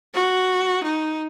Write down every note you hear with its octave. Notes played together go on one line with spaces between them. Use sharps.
F#4
D#4